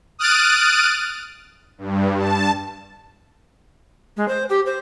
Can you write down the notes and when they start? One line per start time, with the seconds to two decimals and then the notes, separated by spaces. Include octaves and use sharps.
0.19 D#6 F6 F#6 A6 D7 D#7
1.78 G2
2.17 A5
4.16 G#3
4.28 C5
4.49 G4
4.66 C5